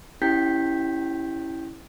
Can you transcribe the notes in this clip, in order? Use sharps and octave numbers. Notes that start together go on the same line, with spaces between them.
C#4 E4 G4 G5 G6 B6